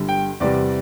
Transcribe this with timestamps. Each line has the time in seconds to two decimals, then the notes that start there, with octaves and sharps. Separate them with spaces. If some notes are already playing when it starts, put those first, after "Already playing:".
Already playing: G1 G2 D3 G3
0.09 G5
0.40 E2 C3 G3 D5